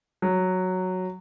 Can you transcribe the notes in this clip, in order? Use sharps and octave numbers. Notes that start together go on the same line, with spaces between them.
F#3